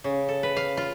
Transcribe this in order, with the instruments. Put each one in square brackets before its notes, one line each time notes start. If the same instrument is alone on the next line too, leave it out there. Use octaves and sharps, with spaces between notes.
[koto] C#3
A4
B4
F5
F4